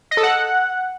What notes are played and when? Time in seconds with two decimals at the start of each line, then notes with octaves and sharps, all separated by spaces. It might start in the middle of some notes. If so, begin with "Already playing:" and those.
0.11 D#5
0.17 A4
0.23 F#5